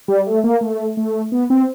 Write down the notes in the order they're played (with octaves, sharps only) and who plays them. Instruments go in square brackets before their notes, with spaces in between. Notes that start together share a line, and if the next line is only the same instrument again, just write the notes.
[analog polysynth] G3
A3
A#3
A3
A3
B3
C4